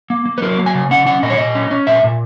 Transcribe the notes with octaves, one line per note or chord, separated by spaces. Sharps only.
A#3
A#3
B4
F#3 A#4
A#3
G#5
C#3
C#4 F#5
C#4 F#5
A#2 D#5
C#5
A#2 D#5
C#4
C#4
A#2 E5
A#2